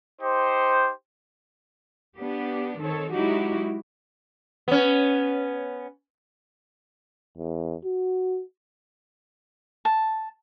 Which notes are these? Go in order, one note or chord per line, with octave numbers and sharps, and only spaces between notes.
D#4 G4 C5
B3 D4 G4
D#3 C4 A4 C#5
F#3 G#3 D#4 E4 F#4 G4
B3 C#4
E2
F#4
A5